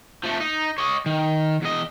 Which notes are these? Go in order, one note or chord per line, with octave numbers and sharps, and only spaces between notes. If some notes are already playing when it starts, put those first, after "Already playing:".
F3 A3
D#4
C#5 D#5
D#3
E2 D#5